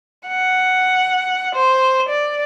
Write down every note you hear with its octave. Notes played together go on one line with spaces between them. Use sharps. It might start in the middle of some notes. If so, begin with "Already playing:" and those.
F#5
C5
D5